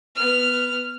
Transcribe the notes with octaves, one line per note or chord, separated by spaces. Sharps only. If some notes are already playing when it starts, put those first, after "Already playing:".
B3 F6